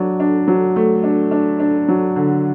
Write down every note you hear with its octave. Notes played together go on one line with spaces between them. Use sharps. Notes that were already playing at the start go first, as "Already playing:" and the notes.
Already playing: F#3 D4
D4
F#3
A3
D4
D4
D4
F#3
D3